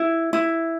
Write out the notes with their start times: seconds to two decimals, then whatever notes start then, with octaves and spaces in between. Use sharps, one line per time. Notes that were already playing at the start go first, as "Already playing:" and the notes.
Already playing: E4
0.33 E4